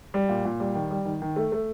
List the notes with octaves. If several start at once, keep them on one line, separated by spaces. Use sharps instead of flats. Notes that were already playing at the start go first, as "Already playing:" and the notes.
G3
A#2
A#2
G3
D#3
G3
D#3
D#3
A3
A3